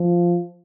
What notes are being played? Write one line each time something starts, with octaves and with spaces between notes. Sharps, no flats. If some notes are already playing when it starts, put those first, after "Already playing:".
Already playing: F3